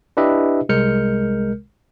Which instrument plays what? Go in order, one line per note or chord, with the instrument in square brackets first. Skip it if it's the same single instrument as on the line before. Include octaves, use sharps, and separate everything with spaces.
[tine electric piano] D4 E4 G4 B4 D#5 E5
C2 G#3 A#4 F6 G6 C#7